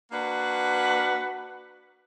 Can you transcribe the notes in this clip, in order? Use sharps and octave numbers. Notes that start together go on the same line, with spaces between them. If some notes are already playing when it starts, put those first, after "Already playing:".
A#3 D4 F#4 B4